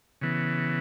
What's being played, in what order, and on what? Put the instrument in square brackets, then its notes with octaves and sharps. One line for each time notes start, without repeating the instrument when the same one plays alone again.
[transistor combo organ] C#3 E3 B3